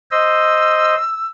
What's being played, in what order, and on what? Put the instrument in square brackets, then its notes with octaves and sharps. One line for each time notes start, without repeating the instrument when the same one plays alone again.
[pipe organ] C5 D#5 [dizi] E6